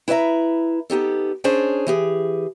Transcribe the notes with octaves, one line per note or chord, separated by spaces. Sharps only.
E4 B4 D5 E5 A#5
B3 D#4 G4 A4
C#4 D4 G#4 C5 C#5
E3 G4 G#4